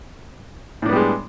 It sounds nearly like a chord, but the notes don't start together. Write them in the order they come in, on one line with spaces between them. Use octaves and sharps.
A2 D4 B3 G3 G#3